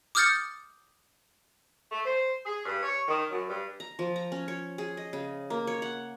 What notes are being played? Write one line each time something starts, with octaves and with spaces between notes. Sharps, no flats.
D6 D#6 F6 G6 A6 C#7
A3
C5
G#4
G2
C#5
D#3
F#2
G2
A#5
F3
A#5
C#4
C#5
G#4
D#5
C#3
A#3
C#5
F#5